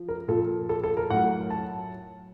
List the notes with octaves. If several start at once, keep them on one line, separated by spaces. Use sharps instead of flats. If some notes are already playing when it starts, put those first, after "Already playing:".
Already playing: F3
A#4
A#2 F3 A4
A4
A4
A#4
A2 F#3 F#5
A5